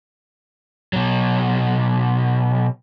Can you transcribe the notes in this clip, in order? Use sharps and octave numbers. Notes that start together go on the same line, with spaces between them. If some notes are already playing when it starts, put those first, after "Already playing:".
B2 F#3